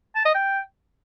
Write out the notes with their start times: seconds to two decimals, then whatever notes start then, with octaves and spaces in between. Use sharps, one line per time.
0.15 A5
0.25 D#5
0.35 G5